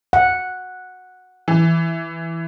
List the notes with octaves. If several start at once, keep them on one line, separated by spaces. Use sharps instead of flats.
F#5
E3